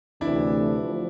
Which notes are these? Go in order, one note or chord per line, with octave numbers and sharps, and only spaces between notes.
D2 C3 E3 A3 D4 E4
F3